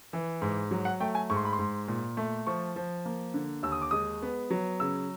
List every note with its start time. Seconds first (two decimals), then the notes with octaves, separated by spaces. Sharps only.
0.13 E3
0.42 G#2
0.71 F#3
0.85 F#5
1.00 A3 G5
1.15 G#5
1.30 G#2 C#6
1.37 C6
1.45 B5
1.53 C6
1.59 G#2
1.88 A#2
2.17 A3
2.47 F3 C#6
2.76 F3
3.05 A#3
3.34 D3
3.63 D#2 E6
3.72 D#6
3.82 D6
3.91 G#3 D#6
4.22 B3
4.50 F#3
4.80 C#3 E6